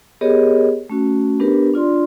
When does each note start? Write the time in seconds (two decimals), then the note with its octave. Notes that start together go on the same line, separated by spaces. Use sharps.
0.21 B3 G4 G#4 A#4 C#5 D#5
0.89 A3 C#4 F#4
1.40 B3 D4 G4 A#4 B4
1.74 D4 F4 D5 C6